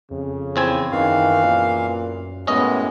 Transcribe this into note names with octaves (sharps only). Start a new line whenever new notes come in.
F2 C#3
E2 C4 G#5
F#2 D#3 E3 F5
A#2
F#2 A2 G#3 B3 C#4 D#5